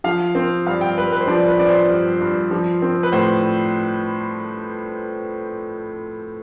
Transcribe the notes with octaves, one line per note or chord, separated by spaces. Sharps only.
F3 F5
C4
G2 F5
G5
G2 B4
B4
C5
F3 D5
B4
C4 D5
C5
G2
G2
F3
C4
B4
A2 C5